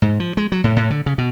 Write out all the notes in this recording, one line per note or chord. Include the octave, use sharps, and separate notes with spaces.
G#2
F3
G#3
F#3
A2
A2
D3
C#3
B2